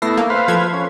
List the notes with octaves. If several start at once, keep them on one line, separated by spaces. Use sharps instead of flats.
A3 B3 E4 A#6 C7
A#3
B4 C5 F5
F3 A4 G#6
C#4